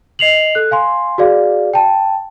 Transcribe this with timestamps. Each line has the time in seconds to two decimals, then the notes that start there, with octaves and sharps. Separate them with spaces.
0.19 D#5 C7 F7 F#7
0.55 A4 F#6
0.71 F5 G#5 C6
1.18 F#4 G#4 D5 F5
1.74 G5 A5